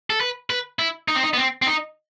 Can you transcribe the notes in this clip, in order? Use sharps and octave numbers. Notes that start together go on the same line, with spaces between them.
A4
B4
B4
E4
D#4
C4
D#4
B3
C4
C4
D#4